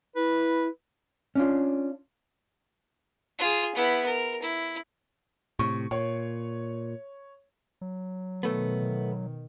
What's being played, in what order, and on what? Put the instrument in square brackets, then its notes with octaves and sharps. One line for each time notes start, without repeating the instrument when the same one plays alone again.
[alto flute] E4 [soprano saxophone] B4
[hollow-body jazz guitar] C#4 D4 F4
[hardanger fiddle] F4 G#4
B3 E4
A#4
E4
[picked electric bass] A2 C3 [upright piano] C#6
[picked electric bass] A#2 [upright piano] C#5
[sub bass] F#3
[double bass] B2 D#3 [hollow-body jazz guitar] A3 B3